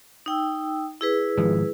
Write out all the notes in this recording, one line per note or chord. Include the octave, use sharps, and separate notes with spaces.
D#4 G5 E6
E4 G#4 B4
G#1 F3